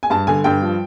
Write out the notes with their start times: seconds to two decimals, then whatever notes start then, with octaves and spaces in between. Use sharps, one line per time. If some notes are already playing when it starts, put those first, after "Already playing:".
0.03 G#5
0.10 G2 A5
0.27 D3 G#5
0.44 G2 G5
0.62 F3